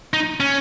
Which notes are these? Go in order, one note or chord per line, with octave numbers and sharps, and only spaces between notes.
D#4
C#4